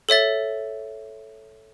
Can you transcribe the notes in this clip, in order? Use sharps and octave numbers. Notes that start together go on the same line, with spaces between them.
A4 C#5 E5 A6